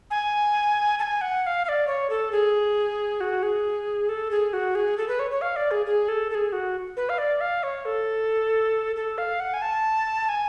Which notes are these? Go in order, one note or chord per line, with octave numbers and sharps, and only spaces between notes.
G#5
A5
G#5
F#5
F#5
F5
F5
D5
C#5
A4
G#4
F#4
G#4
A4
G#4
F#4
G#4
A4
B4
C#5
C#5
F5
D5
G#4
G#4
A4
A4
G#4
F#4
B4
F5
D5
F5
C#5
A4
A4
F5
F#5
G#5
A5
G#5